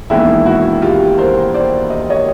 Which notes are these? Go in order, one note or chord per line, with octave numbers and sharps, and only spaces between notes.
E1 D#2 D#3 G#3 B3 E4
E4 F#4
F4 G4
A#4 C5
C5 D5
D#5
C#5 D#5